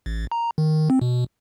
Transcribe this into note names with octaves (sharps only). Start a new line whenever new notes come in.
A1
A#5
D#3
C4
B2